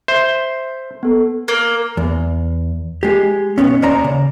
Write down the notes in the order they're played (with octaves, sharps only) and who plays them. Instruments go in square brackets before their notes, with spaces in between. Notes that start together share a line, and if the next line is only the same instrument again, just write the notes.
[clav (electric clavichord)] C5 [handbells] E5
[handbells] B3 A4
[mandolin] A#3
[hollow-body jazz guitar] E2
G#3 G4
B1 B2 B3 C#4
D#2 C#4 C5 D5 A#5
C#3